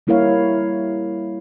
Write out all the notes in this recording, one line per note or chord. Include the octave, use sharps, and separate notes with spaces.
G3 A#3 E4 A#4 C#5 F5